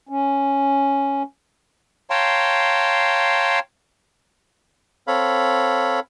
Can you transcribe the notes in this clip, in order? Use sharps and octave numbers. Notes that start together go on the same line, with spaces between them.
C#4
C#5 F5 G5 A5 A#5 C6
C4 A4 C#5 F5 B5